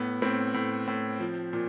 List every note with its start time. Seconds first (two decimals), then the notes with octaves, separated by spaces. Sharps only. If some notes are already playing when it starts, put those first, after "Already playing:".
Already playing: A2 B3
0.22 A2 C4
0.54 A2
0.87 A2
1.20 F3
1.53 A#2